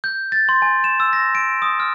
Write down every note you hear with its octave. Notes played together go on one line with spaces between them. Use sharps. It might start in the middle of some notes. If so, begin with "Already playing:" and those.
G6
A6
C6
G#5
E7
E6
A#6
D7
D#6
F6